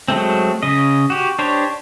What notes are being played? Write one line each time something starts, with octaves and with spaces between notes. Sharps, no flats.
F#3 G#3 A3 C4
C#3 D#5
F#4 G4
D4 G4 C5 C#5